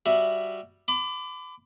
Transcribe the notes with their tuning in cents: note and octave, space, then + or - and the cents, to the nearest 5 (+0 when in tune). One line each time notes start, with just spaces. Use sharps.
G3 +0 F#4 +0 E5 +0
B5 +35 D6 +0